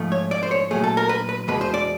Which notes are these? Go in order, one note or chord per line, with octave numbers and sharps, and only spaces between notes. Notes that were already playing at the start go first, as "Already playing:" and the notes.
Already playing: G#2 F3 A3
C#5
D5
C5
C#5
A#2 F#3 A3 G#4
A4
A#4
B4
B4
E2 B2 G#3 B4
C5
D5